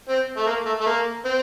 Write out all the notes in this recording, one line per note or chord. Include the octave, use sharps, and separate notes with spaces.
C4
A3
A#3
A3
A3
A#3
C4